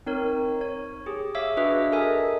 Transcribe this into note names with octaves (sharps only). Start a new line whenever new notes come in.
C4 D#4 A#4 C#5
C#5
G4 G#4
C#5 E5 F5 D6 E6
D4 F#4 G#4 B4 D#5 E5
A4 A#4 D#5 E5 G#5 D#6